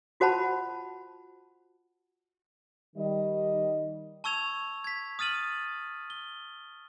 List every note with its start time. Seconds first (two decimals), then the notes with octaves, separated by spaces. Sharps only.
0.20 F4 F#4 C5 F#5 A5 B5
2.96 D#3 G3 D#5
4.24 A5 C#6 E6 G#6 F7
4.84 G#6 B6
5.19 D#6 F6 A6 D#7 F#7
6.10 G7